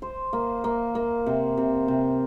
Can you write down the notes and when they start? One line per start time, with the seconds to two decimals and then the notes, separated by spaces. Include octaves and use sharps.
0.02 C5
0.33 A#3
0.64 A#3
0.95 A#3
1.26 C3
1.57 C3
1.88 C3